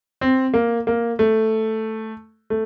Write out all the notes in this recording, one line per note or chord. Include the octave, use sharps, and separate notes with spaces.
C4
A#3
A#3
A3
A3